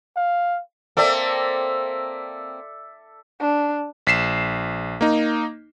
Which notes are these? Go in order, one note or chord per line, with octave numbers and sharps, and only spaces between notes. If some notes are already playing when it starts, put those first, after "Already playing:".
F5
A#3 C4 A4 D5 E5
D4
A#1 B6 C7 E7
A#3 D#4